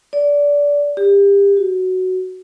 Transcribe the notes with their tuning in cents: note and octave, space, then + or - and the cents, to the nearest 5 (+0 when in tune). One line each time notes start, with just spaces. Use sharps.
D5 -20
G4 +30
F#4 +5